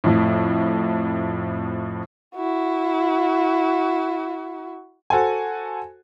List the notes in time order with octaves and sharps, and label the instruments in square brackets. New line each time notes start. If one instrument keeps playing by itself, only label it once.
[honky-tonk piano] F2 A2
[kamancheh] E4 F#4
[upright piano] F#4 A4 C5 G#5